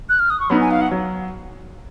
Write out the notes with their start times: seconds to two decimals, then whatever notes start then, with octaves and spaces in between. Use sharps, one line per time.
0.09 F#6
0.19 F6
0.30 D#6
0.40 C#6
0.50 F#3 B3 D#4 B5
0.61 G#5
0.71 F5
0.81 F#5
0.91 F#3